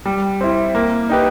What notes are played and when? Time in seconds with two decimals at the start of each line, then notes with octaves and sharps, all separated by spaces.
0.06 G3
0.41 C4 E4
0.75 A#3
1.09 D#4 G4 B4